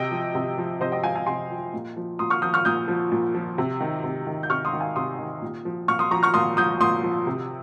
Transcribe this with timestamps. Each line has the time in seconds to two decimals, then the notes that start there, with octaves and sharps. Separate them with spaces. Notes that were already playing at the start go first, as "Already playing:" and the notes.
Already playing: C3 D#5 G5
0.12 F3
0.35 C3
0.58 F3
0.80 C3 C5 D#5
0.92 D#5 G5
1.04 F3 F5 G#5
1.15 F5 G#5
1.26 C3 G#5 C6
1.50 F3
1.74 A#2
1.96 F3
2.19 A#2 C6 D#6
2.30 C#6 F6
2.42 F3 D#6 G6
2.54 C#6 F6
2.65 A#2 D#6 G6
2.88 F3
3.12 A#2
3.35 F3
3.58 C3
3.80 D#3
4.04 C3
4.27 D#3
4.43 G6
4.50 C3 C#6 F6
4.65 C6 D#6
4.73 D#3
4.80 F5 G#5
4.96 C3 C6 D#6
5.19 D#3
5.42 A#2
5.65 F3
5.88 A#2 C#6 F6
5.99 C6 D#6
6.11 F3 A#5 C#6
6.23 C#6 F6
6.34 A#2 C6 D#6
6.57 F3 D#6 G6
6.80 A#2 C6 D#6
7.03 F3
7.27 C3